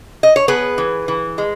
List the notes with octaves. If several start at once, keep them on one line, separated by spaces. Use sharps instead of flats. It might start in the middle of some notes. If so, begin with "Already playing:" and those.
D#5
C#5
B3 G#4 B4
E3
E3
G#3